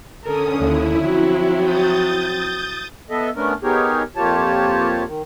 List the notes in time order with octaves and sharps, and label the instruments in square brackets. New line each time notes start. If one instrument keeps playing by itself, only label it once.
[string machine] D3 C#4 D#6 [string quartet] A4 A#4
[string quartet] D#2 D3 [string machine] E4
[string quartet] F3 F#3 C4
[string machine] D#6 G6 A6
[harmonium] B3 A4 D#5 E5
A3 B3 C#4 D4 A#4
B3 D#4 G4 G#4 A#4 C#5
F2 A#3 F4 G4 C#5 A5
D#3